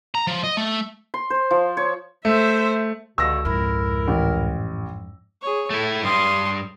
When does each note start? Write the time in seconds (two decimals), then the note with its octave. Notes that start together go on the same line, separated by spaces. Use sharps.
0.15 A#5
0.27 F3
0.43 D#5
0.57 A3
1.14 C6
1.30 C5
1.51 F3
1.77 C#5
2.25 A3 C5 E5
3.18 C#2 G2 B2 D3 E6 A#6
3.45 F2 G#2 E4 A#4
4.08 A1
5.41 G#4 C#5
5.70 A3 E4 A4
6.03 G2 G3 C6 D#6